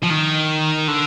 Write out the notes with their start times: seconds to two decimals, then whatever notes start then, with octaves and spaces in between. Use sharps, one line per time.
0.03 F3
0.10 D#3
0.88 D3